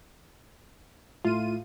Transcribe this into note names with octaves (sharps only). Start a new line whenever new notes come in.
A2 F4 D#7